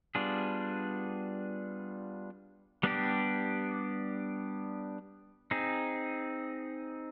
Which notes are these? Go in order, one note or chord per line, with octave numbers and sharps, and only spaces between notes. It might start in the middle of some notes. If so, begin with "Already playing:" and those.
G3 B3 D4 F4 G#4
G3 B3 D4 G4
C4 D#4 G#4